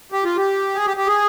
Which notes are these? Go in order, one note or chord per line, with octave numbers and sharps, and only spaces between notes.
G4
F4
G4
G#4
G4
G4
G#4